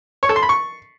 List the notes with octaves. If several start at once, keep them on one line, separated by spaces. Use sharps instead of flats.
C#5
A4
C6
B5
C#6